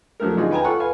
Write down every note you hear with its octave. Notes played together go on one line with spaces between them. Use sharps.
F3 F#3 A3 A#4
D3 C#4 D#4 F4 F#4 G#4
B4 G5 G#5 A#5
F4 A4 C#5 F#5 C#6
B4 F5 G#5